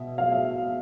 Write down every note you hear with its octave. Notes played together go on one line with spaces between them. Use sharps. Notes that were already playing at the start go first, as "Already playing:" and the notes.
Already playing: B2 E5
F5
E5